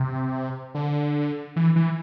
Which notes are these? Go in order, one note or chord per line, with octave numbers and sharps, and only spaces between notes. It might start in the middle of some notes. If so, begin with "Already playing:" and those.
Already playing: C3
D3
E3
E3